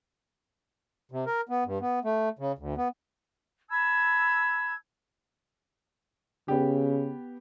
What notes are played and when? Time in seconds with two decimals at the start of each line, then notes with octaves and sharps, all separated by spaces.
1.11 C3
1.26 A#4
1.49 B3
1.66 G2
1.81 B3
2.04 A3
2.39 C#3
2.58 D2
2.77 B3
3.69 A5 B5 E6 G#6
6.48 C#3 B3 G4